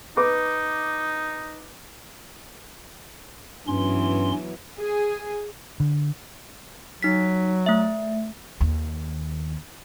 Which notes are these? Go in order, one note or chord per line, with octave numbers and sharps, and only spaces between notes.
D#4 B4 D6
G2 E3 F#3 B3 C#4 C6
G#4
D3
F#3 D#4 B6
A3 E5
D#2